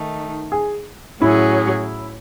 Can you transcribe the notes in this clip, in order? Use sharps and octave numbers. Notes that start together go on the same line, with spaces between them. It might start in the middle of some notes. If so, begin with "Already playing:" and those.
Already playing: D#3 A3 D#4
G#4
A2 F#3 C#4 E4 G#4